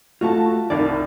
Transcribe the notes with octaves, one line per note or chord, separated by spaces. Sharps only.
A3 F4 F#4 A5
C2 D#3 A#4 D5